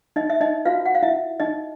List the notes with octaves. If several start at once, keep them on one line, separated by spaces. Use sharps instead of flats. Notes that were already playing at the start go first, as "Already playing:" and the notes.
D#4 D#5
E5
D#4 D#5
F4 F#4 B4 F5
F#5
F5
E4 E5
D#4 D#5